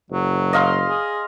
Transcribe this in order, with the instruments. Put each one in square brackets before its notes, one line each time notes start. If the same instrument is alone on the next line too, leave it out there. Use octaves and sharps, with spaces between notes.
[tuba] F#1 [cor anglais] F#3
[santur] D#5 F5 C6
[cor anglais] G#4